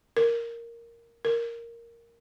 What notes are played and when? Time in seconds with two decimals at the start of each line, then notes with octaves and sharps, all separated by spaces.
0.17 A#4
1.25 A#4